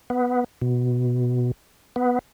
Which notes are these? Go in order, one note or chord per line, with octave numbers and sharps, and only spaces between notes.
B3
B2
B3